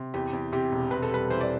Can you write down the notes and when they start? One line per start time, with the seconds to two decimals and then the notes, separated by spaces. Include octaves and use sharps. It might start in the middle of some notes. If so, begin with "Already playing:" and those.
Already playing: C3
0.14 E2 G4
0.33 E2
0.53 C3 G4
0.72 E1
0.91 C3 B4
1.02 A4
1.11 G3 B4
1.30 E3 C5
1.41 D5